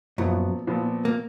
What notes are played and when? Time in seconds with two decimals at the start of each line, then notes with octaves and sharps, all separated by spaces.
0.18 F#2 A#2 F3 F#3 B3
0.67 A#2 F3 B3
1.05 A#3